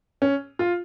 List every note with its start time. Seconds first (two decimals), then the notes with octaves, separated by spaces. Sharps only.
0.22 C#4
0.59 F4